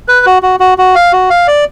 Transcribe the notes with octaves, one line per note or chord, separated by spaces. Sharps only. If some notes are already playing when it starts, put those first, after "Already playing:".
B4
F#4
F#4
F#4
F#4
F5
F#4
F5
D5